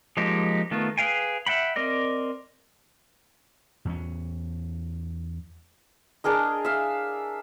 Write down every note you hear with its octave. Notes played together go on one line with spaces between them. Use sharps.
F3 G#3 A#3 D#4 G4
D#3 A3 B3 F4
G#4 B4 F5 G5 G#5
E5 F#5 G5 B5
C4 A#4 D5 D#5
E2 C#4
D4 G#4 A#4 D#5
E5 F5